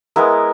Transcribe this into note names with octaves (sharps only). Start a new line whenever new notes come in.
G#3 B3 E4 A#4